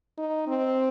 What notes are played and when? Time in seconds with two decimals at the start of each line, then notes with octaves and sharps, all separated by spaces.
0.18 D#4
0.48 C4